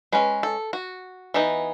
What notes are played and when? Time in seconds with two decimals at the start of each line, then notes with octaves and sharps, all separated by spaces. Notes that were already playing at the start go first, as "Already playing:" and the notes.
0.12 G#3 C#4 B4
0.43 A4
0.73 F#4
1.34 E3 B3 D#4